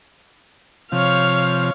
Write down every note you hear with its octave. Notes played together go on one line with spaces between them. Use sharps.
C3 F3 C#5 F5